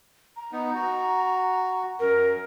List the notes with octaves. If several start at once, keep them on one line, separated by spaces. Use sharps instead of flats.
A#5
B3 D#4
F#4
F#2 A#4